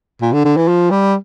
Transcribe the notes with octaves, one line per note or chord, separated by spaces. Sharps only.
A#2
D3
D3
E3
F3
G3